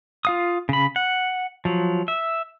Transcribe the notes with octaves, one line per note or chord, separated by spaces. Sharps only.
F4 F5 D#6
C#3 B5
F#5
F3 F#3
E5